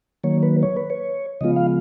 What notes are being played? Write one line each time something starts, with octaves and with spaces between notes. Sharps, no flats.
D#3 F#3 A#3 C#5
B4
C#5
B4
C#5
C#3 F3 G#3 B3 F4 D#5
F5